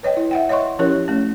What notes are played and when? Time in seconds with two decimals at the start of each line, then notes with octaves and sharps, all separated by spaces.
0.03 B4 C#5 D#5 G5
0.17 E4
0.31 E5 F#5 G5
0.49 C#5 D#5 E5 C6 C#6
0.79 F3 C#4 E4 G4 A#4 C#5
1.08 A3 C#4